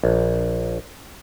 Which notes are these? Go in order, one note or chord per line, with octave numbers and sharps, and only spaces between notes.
A#1